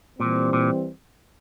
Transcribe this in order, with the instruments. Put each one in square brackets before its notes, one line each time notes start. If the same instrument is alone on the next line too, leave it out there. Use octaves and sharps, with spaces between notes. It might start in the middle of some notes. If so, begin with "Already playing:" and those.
[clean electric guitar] A#2 [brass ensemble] E3 G3 C4
[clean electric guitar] A#2